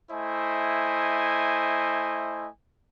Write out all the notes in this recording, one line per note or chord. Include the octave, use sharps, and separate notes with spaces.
A3 E4 C5 D#5 G#5